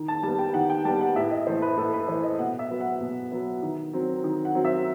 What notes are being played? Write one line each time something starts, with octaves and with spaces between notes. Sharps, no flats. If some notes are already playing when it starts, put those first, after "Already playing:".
Already playing: D#3
A5
G3 B3 A5
G5
D#3 F#5
G5
G3 B3 A5
F#5
A2 E5
D#5
E3 A3 C5
B4
A2 A4
B4
E3 A3 C5
D#5
B2 F#5
E5
F#3 B3
F#5
B2
F#3 B3
D#3
F#3 C4
D#3
F#5
F#3 C4
E5